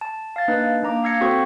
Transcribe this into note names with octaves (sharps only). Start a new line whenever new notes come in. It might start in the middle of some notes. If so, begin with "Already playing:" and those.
A5
F5 A6
A#3 D4 D#4 B4 D#5
A#3 D4 A#5 D6
F5 E6 G#6 A#6 C#7
C4 F#4 A4 C5 C#6 D#6